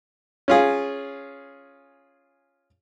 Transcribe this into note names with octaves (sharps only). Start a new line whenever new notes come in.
C#4 F4 G#4